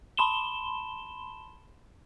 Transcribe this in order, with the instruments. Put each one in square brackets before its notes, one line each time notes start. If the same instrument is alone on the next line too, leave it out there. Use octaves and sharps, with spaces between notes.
[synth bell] A5 B5 C6 E7 G7